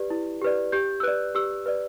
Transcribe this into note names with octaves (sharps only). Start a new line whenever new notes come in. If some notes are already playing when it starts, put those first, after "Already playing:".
Already playing: G4 B4 D5
E4
G4 B4 D5
G4 G6
E6
B4 D5 F#6
G4 E6
B4 D5